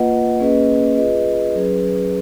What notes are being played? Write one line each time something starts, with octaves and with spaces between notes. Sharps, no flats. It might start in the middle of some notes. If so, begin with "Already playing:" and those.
Already playing: A#3 F4 B4 D#5 F#5
A#3 C#4 G#4 B4 D#5
F4 G#4 B4 D#5
F#3 C#4 G#4 B4